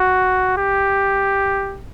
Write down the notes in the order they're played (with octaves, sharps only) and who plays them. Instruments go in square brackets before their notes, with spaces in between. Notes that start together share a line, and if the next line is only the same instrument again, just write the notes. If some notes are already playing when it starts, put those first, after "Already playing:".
Already playing: [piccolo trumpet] F#4
G4